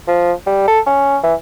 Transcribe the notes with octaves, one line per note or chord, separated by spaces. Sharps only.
F3
G3
A4
C#4
E3